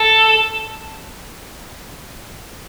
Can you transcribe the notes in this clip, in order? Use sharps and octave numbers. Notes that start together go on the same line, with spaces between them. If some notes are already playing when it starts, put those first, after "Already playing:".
Already playing: A4